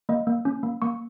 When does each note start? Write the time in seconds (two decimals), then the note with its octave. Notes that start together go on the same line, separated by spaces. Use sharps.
0.09 A#3 D#5
0.27 A#3
0.45 C#4
0.63 A#3
0.82 A#3 C#6